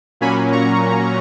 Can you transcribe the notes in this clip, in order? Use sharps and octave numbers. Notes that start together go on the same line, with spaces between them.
A#2 F#3 A#3 C#4 G#5 B5
A#5 C#6